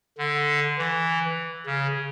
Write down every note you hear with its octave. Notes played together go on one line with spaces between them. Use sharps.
D3
E3
C#3